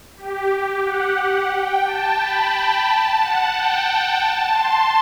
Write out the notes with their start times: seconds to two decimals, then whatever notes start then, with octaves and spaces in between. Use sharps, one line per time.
0.16 G4
0.83 F#5
1.50 G5
1.84 A5
2.18 B5
2.51 G5
2.85 A5
3.18 F#5
3.52 G5
3.85 G5
4.19 A5
4.52 C6